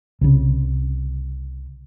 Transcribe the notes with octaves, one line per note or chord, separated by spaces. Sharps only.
C2 C#3